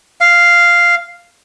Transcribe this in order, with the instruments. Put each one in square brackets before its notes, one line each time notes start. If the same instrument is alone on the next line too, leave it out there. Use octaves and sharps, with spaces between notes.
[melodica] F5